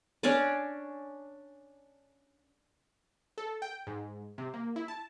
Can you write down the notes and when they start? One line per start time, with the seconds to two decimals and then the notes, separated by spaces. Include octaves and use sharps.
0.23 C#4 D4 C#5 D5
3.38 A4
3.62 G5
3.87 G#2
4.38 C3
4.54 A#3
4.76 E4
4.88 A5